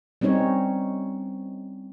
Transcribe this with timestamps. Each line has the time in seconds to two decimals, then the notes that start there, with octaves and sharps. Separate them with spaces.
0.21 G3 C4 C#4 D#4 C#5